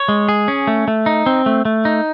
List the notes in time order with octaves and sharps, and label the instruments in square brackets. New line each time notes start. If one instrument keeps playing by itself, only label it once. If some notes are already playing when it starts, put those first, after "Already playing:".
Already playing: [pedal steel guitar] C#5
G#3
G#4
C#4
A3
A3
D#4
C4
A3
A3
D#4